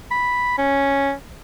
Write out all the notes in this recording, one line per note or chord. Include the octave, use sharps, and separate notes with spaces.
B5
C#4